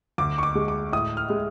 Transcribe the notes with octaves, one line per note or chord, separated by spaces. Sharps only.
D2 D6
C#6
D6
G#3
D6
A2 D#6
F6
G#3